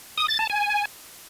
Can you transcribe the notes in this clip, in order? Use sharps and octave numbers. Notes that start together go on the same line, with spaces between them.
D#6
A6
A5
G#5